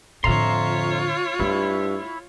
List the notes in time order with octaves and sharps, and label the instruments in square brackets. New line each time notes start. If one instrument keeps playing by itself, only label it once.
[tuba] F2 [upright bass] A2 D3 [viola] F4 C#5 [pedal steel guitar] E5 A#5 C6
[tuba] G2 [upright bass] A3 D4 [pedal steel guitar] E4